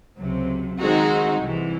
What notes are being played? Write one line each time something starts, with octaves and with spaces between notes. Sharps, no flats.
C#2 C3 F#3
D#3 G#3 C4 D#4 F#4
C2 C3 E3